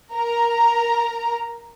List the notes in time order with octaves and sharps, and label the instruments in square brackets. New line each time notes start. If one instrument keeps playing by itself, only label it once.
[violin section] A#4 A#5